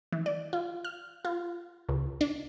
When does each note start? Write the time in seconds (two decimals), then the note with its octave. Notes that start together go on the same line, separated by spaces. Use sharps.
0.12 E3
0.26 D5
0.53 F4
0.84 F6
1.25 F4
1.89 C#2
2.21 D4